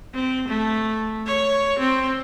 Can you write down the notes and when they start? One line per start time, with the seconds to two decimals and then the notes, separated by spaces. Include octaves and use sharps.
0.14 C4
0.48 A3
1.27 C#5
1.79 C4